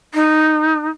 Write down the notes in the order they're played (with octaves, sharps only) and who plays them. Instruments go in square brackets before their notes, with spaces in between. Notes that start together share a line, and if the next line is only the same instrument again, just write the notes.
[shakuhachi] D#4